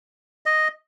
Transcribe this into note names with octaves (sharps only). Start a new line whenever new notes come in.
D#5